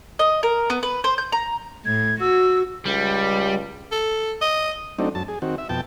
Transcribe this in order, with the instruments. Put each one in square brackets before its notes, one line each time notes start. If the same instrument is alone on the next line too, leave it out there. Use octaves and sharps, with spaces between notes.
[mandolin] D#5
A#4
B3
B4
C5
G6
A#5
[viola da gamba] A2 [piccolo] G#6
[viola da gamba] F#4 [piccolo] E6
[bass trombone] C#2 [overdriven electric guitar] G3
[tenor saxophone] A4
D#5
[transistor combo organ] F#3 A3 C4 D4 D#4
F#2 A5
G#4
D#3 C4 F#4
E5
F2 B2 G5 A5